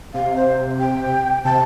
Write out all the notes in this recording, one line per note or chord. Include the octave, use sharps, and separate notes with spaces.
C3 F5
C5
G5
C3 A5